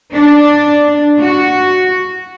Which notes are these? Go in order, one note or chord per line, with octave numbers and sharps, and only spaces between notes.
D4
F#4